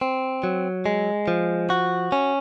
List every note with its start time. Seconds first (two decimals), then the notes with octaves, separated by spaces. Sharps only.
0.01 C4
0.44 F#3
0.86 G#3
1.28 F3
1.70 F#4
2.12 C#4